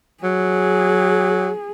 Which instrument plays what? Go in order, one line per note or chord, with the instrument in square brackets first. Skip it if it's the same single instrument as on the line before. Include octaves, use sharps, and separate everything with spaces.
[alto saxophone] F#3 [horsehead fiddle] G#4